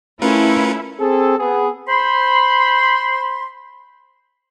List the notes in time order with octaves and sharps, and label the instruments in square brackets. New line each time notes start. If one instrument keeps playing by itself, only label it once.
[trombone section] A3 [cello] C#4 [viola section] E4 [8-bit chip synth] F4 A#4 B4
[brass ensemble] C4 G#4 A4
B3 G#4
[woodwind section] C5 B5 C6